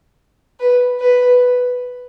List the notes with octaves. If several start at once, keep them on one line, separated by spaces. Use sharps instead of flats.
B4
B4